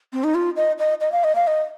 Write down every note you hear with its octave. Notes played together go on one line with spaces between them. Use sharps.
C4
D#4
F4
D#5
D#5
D#5
F5
D#5
F5
D#5